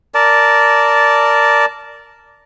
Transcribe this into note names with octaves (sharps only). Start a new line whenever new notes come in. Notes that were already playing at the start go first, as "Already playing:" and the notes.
A#4 D5 A5